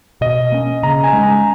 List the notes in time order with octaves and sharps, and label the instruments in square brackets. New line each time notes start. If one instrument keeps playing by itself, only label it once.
[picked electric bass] B2 [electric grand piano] D#5
[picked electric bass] A#3 C#4
[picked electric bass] C#3 [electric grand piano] A#5
[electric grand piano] G#5
[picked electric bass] G#3 C#4
[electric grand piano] A#5